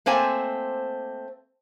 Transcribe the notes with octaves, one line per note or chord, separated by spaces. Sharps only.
A3 A#3 C4 C5 G#5